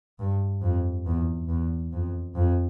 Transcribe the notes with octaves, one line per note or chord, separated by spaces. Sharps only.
G2
F2
E2
E2
F2
F2